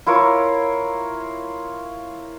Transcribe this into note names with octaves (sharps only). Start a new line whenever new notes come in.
E4 F4 A#4 C#5